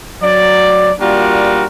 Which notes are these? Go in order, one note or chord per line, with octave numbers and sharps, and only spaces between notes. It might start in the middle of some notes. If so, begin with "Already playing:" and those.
F#3 D5
G3 A#3 D4 F4 F#4 A#4